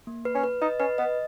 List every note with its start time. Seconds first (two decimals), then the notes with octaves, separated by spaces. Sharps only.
0.07 A#3
0.25 B4
0.35 C#4
0.43 B4
0.61 D#4 D#5
0.80 C#4 B4
0.98 B3 D#5